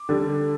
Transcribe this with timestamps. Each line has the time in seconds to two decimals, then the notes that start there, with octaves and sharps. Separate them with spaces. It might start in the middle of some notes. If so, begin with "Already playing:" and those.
Already playing: D6
0.09 D3 G3